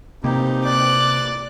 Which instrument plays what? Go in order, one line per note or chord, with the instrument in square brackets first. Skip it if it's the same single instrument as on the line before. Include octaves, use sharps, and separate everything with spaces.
[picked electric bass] C3 A#3 [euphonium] C4 [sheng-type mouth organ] D#4 G4
[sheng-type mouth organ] D5 [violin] D6 F#6